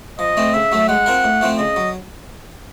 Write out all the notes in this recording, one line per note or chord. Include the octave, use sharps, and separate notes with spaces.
F3 D#5
A3 C4
C#3 E5
F#3 A3
G#3 F#5
C4 F4 A#4
A2
F3 A3 C4
C#3 D#5
F#3